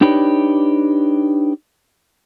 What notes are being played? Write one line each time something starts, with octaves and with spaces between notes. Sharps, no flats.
D4 D#4 G4 B4 C#5 D5